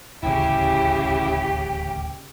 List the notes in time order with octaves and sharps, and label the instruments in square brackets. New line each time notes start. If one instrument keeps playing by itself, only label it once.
[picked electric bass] D#1 A1 D2 [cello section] C#3 G4 [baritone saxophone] E4 [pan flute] G5